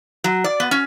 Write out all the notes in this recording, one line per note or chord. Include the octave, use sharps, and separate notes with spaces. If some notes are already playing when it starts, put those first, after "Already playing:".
F#3
D5
B3
C#4